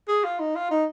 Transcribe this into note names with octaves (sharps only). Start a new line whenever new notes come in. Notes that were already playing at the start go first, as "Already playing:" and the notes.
G#4
F4
D#4
F4
D#4